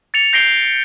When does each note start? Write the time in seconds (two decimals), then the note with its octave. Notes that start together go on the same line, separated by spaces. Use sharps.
0.14 A6 C#7 F7
0.33 G6 A#6 C7 D7 G7